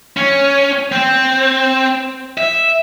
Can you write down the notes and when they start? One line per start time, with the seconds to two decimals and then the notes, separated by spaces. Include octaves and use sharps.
0.17 C#4
0.92 C4
2.38 E5